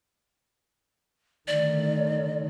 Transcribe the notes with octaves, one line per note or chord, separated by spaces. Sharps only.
D3 D#3 A3 D5